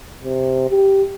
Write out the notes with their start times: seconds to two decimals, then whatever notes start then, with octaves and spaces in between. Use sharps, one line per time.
0.24 C3
0.70 G4